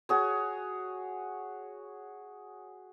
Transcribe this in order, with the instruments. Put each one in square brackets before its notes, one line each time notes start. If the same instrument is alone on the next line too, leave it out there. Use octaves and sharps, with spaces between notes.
[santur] F#4 G#4 C#5